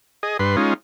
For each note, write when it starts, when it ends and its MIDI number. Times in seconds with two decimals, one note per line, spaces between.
0.23 0.37 68
0.23 0.37 75
0.39 0.56 43
0.39 0.56 71
0.39 0.56 84
0.57 0.74 56
0.57 0.74 61
0.57 0.74 63
0.57 0.74 65